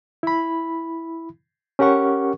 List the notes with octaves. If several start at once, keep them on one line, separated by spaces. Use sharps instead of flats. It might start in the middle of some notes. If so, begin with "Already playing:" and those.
E4 B5
C#4 G4 A#4 F#5 C#6